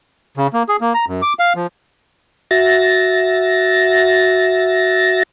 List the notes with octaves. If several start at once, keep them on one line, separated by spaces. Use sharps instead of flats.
C#3
A#3
G#4
A#3
A#5
F#2
D6
F5
F3
F#4 E5 A6 A#6